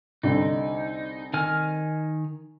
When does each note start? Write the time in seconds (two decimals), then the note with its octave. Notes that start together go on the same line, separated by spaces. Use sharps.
0.23 C2 D3 D#4
1.34 D#3 G#5 F6